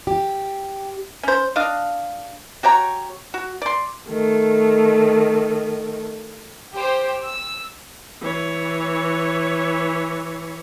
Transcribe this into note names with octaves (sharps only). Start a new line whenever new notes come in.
G4
C#4 C5
D4 D#5 F5
F#4 G4 C#5 A#5
F#4
D5 C6
D#3 A3
G4 C5
E6
E3 C#5